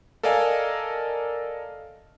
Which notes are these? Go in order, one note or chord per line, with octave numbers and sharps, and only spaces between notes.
A4 A#4 D5 D#5 F5 G#5